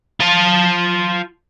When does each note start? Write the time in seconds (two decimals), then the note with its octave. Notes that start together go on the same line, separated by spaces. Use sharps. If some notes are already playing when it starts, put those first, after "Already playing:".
0.20 F4 A5